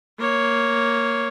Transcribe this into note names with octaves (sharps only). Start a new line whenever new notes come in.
A#3 C#5